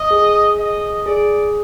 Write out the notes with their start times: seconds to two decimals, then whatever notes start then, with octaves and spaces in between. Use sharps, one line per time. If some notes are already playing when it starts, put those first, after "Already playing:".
Already playing: D#5
0.11 G#4
0.58 D#5
1.06 G#4 D5